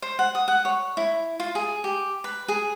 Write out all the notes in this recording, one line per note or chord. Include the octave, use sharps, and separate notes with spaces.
C5
F#5
D#6
F#5
C#5
E4
F4
G#4
G4
B4
G#4